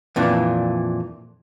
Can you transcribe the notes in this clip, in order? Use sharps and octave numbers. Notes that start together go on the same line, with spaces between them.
F2 A#2 E3 D4